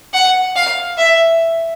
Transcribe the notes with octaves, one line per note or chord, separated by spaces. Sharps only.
F#5
F5
E5